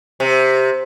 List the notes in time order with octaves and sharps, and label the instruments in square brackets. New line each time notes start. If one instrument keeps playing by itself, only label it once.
[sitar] C3